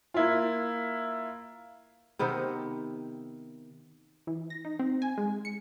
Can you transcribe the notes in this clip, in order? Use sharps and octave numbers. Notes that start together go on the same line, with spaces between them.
A#3 E4 F4
C3 D#3 B3 C5
E3
A#6
D#4
C4
G#5
G#3
C#7